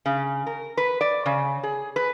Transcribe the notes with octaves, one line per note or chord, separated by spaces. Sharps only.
C#3
A#4
B4
D5
C#3
G#4
B4